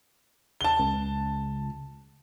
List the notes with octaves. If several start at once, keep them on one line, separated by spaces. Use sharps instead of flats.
A5 G7
C#2